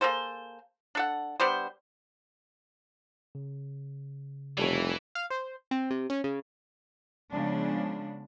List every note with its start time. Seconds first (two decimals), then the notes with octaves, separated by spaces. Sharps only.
0.01 A#3 G#4 A4 C5
0.95 D4 A4 F#5
1.40 G3 B3 D4 C5
3.35 C#3
4.58 F1 E3 G3 A4 C#5
5.15 F5
5.30 C5
5.71 C4
5.91 C3
6.10 C#4
6.24 C#3
7.31 C#3 F3 G#3 B3 D4